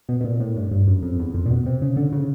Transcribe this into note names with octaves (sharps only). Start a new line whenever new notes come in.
B2
B2
A#2
A2
G2
G2
F#2
F2
E2
F2
A#2
B2
C3
C#3
D3
C#3